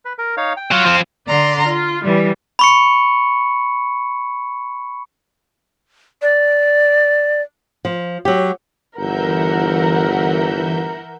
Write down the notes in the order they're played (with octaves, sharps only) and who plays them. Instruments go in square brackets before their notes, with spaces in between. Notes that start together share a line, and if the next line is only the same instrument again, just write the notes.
[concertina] B4
A#4
D#4 C#5 F5
G5
[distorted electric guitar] F#3 [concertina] F4
[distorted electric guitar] F3 C4
[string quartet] D3 D5 A#5 C6
F4
E3 G3
[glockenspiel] B5 C#6 C#7
[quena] D5
[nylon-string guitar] F3
F#3 G4
[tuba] G1 [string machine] E3 E5 G6 [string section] A#4 F#5